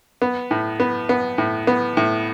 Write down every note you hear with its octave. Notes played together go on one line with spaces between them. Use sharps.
B3
A2
B3
B3
A2
B3
A2